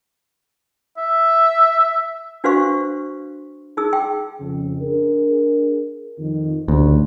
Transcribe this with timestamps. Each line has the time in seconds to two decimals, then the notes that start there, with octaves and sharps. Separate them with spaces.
0.97 E5
2.44 D4 F#4 B4 C5 F5 C#6
3.77 D#4 G#4 E6
3.93 G5
4.40 F2 C#3
4.81 D4 G#4 A#4
6.19 F2 D#3
6.68 A1 D2